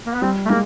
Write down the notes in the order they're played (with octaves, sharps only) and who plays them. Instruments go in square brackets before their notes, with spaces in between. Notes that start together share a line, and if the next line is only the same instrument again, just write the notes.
[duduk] A#3
B3
[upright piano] G3 [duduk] C4
[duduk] A3
[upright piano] G#3 [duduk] A#3